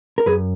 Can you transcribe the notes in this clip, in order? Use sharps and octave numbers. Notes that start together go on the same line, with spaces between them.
A#4
F#2 G#4 B4